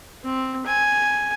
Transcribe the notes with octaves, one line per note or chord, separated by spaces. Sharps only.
C4
G#5